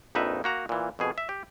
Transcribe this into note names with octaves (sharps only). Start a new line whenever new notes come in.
A#1 F2 D#4 B4 E5
A#3 F#4 A#5
A#2 E3
F2 B2 G#4
E5
G4